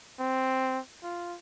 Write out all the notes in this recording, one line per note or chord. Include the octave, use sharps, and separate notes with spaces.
C4
F4